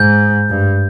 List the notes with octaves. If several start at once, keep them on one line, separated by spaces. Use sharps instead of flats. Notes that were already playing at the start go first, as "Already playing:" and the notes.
Already playing: G#2 G6
G2